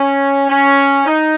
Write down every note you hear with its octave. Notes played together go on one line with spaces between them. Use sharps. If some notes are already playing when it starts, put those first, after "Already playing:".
Already playing: C#4
C#4
D#4